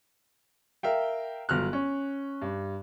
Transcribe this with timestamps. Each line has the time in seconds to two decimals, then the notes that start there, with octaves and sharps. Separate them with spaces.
0.83 A#4 E5 F5 G5
1.49 G1 F#3 F6 F#6
1.73 C#4
2.42 G2